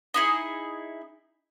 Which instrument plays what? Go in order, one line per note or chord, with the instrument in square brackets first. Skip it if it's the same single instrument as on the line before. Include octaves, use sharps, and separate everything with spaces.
[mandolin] D#4 E4 G#4